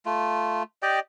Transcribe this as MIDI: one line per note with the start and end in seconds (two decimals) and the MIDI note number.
0.06 0.63 57
0.06 0.63 65
0.83 1.00 67
0.83 1.00 74
0.83 1.00 75
0.83 1.00 79